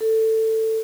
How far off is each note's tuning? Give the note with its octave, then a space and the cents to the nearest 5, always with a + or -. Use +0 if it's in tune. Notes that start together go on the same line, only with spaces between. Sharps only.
A4 +15